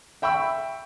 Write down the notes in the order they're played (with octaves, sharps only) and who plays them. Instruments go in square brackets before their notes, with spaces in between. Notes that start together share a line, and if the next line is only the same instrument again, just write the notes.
[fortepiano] E5 G5 B5 C#6 E6